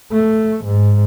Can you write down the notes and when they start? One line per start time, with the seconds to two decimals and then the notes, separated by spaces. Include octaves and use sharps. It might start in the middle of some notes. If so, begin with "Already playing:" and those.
0.12 A3
0.65 G#2